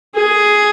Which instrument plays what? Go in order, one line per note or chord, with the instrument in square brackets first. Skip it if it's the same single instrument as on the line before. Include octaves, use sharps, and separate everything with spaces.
[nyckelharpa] G#4